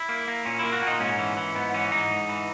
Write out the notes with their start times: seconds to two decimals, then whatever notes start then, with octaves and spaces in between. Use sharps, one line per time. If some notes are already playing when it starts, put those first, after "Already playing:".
Already playing: E4
0.09 A#3
0.28 A#3
0.45 A#2 C#4
0.59 A#3 E4
0.72 F#4
0.82 A#2 D#4
1.00 G#2 C#4
1.19 E3
1.37 E3
1.55 G#2 B3
1.74 E3 C#4
1.92 G#2 D#4
2.10 G#2
2.29 E3